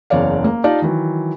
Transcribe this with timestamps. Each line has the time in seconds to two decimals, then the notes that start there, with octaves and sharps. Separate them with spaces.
0.10 F#1 E2 C#5 D5 F5
0.44 A#3
0.64 D#4 F4 G4 D5 F5 A5
0.82 D#3 E3 F#3